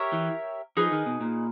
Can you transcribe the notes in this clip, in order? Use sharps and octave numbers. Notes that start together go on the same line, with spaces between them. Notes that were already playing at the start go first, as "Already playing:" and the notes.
Already playing: G4 A#4 C#5 E5
E3
F3 D#4 G#4 B4
D#3
B2
A#2